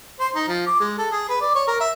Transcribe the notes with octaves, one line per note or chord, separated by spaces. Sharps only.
C5
D#4
F3
D6
G#3
A4
G#4
B4
D5
C#5
A#4
E5